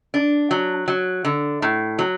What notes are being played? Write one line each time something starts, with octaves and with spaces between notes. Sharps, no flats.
D4
F#3
F#3
D3
A2
F#3